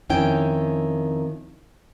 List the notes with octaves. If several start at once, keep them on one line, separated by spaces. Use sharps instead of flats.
F2 D#3 C#4 E4 G5